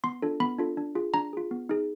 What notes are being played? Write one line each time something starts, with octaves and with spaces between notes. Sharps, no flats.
B3 C6
D4 F4 A4
B3 B5
D4 F4 A4
D4
F4 G#4
D4 A#5
F4 G#4
B3
D#4 G#4